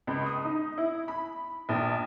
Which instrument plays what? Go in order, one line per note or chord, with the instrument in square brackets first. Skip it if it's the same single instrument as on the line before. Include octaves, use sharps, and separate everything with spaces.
[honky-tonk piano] C#2
D#6
D#4
E4
B5
A#1